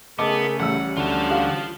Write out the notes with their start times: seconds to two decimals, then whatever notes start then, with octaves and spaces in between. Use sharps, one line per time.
0.19 C#3 A3 B3 G#4 A#4 D#5 A5 D6
0.60 A1 G3 C#4 F#5 E6
0.97 D2 D3 F4 F#4 A5
1.31 G4 F5